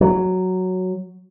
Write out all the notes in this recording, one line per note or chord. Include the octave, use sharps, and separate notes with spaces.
F#3